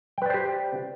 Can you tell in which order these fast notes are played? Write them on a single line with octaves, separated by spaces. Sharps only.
G5 B4 D5 C5 G4